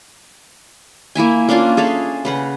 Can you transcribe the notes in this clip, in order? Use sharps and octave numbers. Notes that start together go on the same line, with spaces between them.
A#3 E4 E5 G#5
A#3 C#4 D4 F4
G#4 A4 E5 F5
C#3 B4 F#5